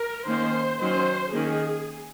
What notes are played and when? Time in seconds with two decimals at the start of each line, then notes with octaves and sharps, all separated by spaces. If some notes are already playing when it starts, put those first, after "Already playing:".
Already playing: A#4
0.26 D#3 A#3 C#4 C5
0.79 D#3 F#3 C#4 C5
1.32 D#3 A#3 C#4 G#4